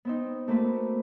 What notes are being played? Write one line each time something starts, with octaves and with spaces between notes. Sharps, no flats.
B3 C4 D#4
A3 A#3 C4 F#4 B4